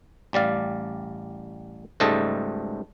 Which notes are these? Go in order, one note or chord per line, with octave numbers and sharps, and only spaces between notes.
A1 G3 D5 F5
C#2 G#2 G3 A3 A4 D#5